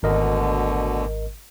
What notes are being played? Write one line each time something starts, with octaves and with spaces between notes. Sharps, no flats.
G#1 D2 B2 D3 A#4 D#5